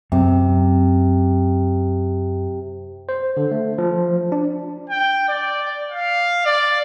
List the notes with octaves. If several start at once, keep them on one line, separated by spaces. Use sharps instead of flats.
F#2 C3
C5
D3
A3
F3
D4
G5
D5
F5
D5